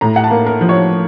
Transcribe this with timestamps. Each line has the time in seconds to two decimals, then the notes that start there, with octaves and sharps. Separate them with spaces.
0.01 A2 A#5
0.16 F#5
0.24 A5
0.31 A#3
0.47 A#4
0.61 F3
0.69 C#5